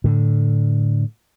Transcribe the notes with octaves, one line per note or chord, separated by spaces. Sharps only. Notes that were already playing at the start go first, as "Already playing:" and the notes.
A2 D3